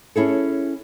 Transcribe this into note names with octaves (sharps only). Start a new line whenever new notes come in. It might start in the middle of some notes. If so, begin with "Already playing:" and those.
C#4 E4 G#4 A4